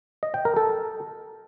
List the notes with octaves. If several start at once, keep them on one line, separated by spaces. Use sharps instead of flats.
D#5
G5
A#4
A4